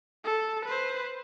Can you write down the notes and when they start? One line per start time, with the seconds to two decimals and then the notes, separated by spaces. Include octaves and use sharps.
0.25 A4
0.66 B4 C5